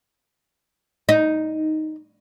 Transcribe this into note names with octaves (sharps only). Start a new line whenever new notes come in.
D#4